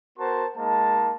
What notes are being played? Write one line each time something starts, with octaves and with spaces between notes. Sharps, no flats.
B3 F#4 A#4 C5 A5 C6
G#3 A#3 D#4 A5